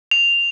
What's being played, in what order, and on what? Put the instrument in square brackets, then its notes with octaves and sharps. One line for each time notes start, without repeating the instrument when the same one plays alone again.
[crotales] F7